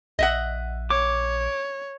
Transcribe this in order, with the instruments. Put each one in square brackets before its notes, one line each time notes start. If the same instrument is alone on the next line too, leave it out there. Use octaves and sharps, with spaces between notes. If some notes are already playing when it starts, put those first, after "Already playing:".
[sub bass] A#1 [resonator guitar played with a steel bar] D#5 E5 F#5
[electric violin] C#5 [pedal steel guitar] D6